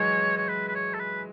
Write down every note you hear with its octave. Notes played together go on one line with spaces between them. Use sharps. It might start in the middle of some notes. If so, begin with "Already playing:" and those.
Already playing: E3 F#3 G#3 C#5
C#5
B4
B4
C#5
A4
B4